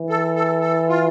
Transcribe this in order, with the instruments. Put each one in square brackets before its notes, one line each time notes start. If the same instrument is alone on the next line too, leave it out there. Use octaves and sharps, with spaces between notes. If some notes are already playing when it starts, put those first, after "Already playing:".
Already playing: [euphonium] E3
[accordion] A4
A4
A4
F4